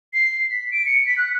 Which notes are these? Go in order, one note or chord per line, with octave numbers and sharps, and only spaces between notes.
C7
B6
D7
C#7
B6
F#6